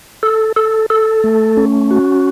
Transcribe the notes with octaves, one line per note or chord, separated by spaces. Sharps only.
A4
A4
A4
A3
C#4
F#4